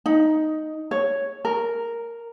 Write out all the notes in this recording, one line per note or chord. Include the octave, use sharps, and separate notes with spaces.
D#4
C#5
A#4